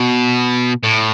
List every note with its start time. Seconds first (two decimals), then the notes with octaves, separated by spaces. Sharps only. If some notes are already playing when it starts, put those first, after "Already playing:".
Already playing: B2
0.83 A2